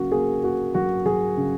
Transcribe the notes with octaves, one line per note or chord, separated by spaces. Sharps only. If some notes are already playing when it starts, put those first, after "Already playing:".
Already playing: C#3 F#3 A#3 F#4
A#3 G#4
A#3 F#4
F#3 F#4
F#3 G#4
C#3